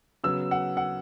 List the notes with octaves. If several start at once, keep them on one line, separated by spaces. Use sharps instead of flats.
C#3 F#3 B3 E6
F#5
F#5